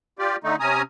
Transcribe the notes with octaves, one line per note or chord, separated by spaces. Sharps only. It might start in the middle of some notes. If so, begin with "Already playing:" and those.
F4 G4 D5
D3 A3 D#4
C3 C#4 G#5 A#5 D#6